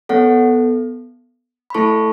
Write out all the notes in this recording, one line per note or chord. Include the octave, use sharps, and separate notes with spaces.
B3 A4 C#5 F#5
B5
A3 E4 A4 A5 C#6